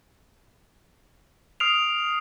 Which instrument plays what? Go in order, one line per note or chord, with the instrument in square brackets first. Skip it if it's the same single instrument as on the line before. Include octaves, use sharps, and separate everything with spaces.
[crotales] D#6 F6 C7 D7 F7